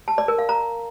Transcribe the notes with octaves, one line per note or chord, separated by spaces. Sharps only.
A5
D5
A#4
F5
A#5